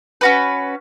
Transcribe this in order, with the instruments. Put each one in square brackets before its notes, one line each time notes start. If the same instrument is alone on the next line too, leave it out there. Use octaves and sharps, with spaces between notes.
[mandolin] C#4 F#4 B4